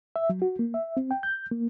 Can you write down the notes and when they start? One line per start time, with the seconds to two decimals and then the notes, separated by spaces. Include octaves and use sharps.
0.16 E5
0.30 F#3
0.42 F#4
0.59 A#3
0.74 E5
0.97 C4
1.11 G5
1.23 G6
1.51 A#3